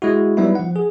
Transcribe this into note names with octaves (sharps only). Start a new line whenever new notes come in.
G#3 E4 F#4
F#3 G3 B3 D#4 E4
F3 F#5
G#4